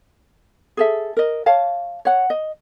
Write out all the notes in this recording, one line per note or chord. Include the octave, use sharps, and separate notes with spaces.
G#4 A4 E5
A#4 D#5
C#5 F5 A5
C#5 F#5
D#5